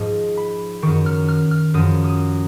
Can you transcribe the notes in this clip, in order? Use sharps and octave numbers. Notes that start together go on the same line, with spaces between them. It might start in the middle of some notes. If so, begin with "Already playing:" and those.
Already playing: G#2 F3 D#5
B5
F#2 D#3 C#6
F6
F6
F6
F#2 F3 D#6
D#6